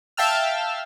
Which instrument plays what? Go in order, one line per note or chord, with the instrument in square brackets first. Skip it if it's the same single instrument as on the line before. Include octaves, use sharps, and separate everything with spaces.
[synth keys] E5 F5 G5 A5 E6 F6